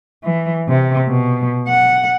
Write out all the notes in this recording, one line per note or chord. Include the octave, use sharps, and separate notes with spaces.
E3
C3
B2
F#5